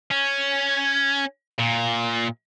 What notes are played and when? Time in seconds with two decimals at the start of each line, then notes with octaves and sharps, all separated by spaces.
0.11 C#4
1.59 A#2